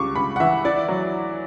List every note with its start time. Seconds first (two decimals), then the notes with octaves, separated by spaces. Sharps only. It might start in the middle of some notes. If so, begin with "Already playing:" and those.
Already playing: C#2 G3 C#6 D6
0.15 C#2 B5
0.36 F#5
0.40 E3 E5
0.65 E4 D5
0.89 F#3